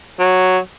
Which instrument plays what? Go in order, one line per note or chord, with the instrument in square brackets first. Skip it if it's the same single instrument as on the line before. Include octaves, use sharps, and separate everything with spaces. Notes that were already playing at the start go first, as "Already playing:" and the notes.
[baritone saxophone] F#3